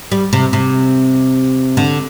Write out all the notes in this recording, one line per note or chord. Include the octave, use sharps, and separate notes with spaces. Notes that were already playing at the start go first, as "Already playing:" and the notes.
G3
C3
C3
D3